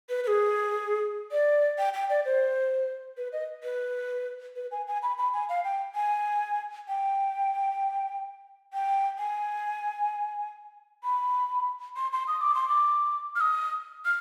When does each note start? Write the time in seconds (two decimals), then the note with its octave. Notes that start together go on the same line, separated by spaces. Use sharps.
0.09 B4
0.24 B4
0.27 G#4
1.32 D5
1.78 G5
1.94 G5
2.10 D5
2.25 C5
3.17 B4
3.33 D#5
3.64 B4
4.56 B4
4.71 G#5
4.87 G#5
5.03 B5
5.18 B5
5.34 G#5
5.49 F5
5.64 G5
5.95 G#5
6.88 G5
8.73 G5
9.19 G#5
11.04 B5
11.97 C6
12.13 C6
12.27 D#6
12.41 D6
12.55 C6
12.69 D6
13.36 F6
13.41 D#6
14.06 F6